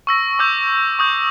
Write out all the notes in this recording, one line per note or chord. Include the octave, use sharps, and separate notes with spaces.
C#6 E6 A#6
C#6 D6 E6 G6
C#6 D#6 G6